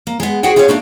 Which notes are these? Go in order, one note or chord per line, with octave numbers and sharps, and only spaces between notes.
A#3
G#3 B3
F#4 G#4 C5 F#5 G5
E4 F4 G#4 B4 C#5 F5
A3 A#3 D4 D#4